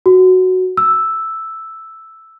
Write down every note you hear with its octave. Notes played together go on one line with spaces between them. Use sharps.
F#4
E6